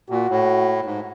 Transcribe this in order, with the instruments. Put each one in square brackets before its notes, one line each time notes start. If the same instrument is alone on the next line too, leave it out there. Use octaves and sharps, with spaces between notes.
[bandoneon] A#2 [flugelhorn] F#4
[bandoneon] A2
G#2